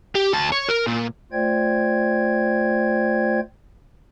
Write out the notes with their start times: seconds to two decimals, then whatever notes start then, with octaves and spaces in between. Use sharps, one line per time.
0.15 G4
0.33 D2 A5
0.52 C#5
0.69 A#4
0.87 A#2
1.32 A3 F4 C5 D5 G5 G#6